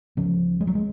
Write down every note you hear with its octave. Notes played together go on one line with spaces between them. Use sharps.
C#2 C#3 F3
G#3
F#3
G#3